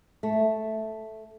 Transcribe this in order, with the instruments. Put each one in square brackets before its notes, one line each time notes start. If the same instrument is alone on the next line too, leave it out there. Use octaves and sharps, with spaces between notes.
[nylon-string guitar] A3